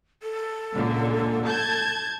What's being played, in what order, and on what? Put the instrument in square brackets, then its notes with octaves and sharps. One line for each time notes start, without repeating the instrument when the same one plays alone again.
[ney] A4
[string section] C#2 A#2 D3
A5 G6 G#6